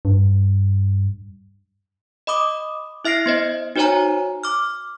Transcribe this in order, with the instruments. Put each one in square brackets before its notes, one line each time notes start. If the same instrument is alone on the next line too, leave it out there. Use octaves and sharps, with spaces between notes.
[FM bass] G2
[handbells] D#5 B5 D6 D#6
E4 E5 F6 A#6 C7 D7
B3 C5 D#5
D#4 F#4 C5 C#5 G#5 A#5
D6 F6